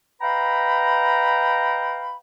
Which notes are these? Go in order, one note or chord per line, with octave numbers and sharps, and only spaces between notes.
B4 D#5 F5 G5 A#5 B5